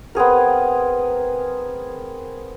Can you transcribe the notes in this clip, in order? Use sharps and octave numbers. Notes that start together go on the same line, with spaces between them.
B3 C4 G#4 A#4